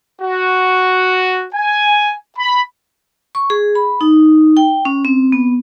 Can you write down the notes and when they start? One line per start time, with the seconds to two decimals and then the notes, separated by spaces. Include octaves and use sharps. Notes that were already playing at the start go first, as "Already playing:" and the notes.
0.22 F#4
1.55 G#5
2.39 B5
3.35 C#6
3.50 G#4
3.75 B5
4.01 D#4
4.57 G5
4.85 C#4
5.05 C4
5.32 B3